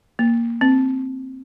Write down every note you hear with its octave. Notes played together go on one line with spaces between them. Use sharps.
A#3
C4